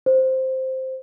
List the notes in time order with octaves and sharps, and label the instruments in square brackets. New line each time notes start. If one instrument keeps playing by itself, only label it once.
[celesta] C5